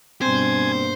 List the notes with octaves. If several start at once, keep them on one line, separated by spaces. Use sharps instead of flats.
G2 B2 A#3 C4 C5 G#5